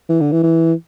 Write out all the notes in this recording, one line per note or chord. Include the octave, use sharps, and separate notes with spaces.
E3
D3
E3
E3